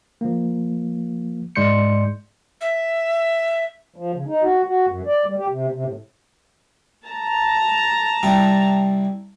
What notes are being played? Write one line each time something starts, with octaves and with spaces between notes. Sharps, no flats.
F3 A#3
G#2 G#3 D5 C6 G6 C#7
E5
F3
C#3
D#4
F#4
F#4
F#2
D5
G3
G4
C3
C3
A2
A5 A#5
C2 G3 E4